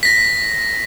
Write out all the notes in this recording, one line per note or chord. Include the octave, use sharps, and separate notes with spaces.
A#6 B6